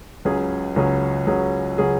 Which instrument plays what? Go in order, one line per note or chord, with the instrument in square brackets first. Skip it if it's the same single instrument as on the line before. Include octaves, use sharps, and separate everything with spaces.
[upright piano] C#2 C#3 F#3 C#4 G#4
C#2 C#3 F#3 C#4 G#4
C#2 C#3 F#3 C#4 G#4
C#3 F#3 C#4 G#4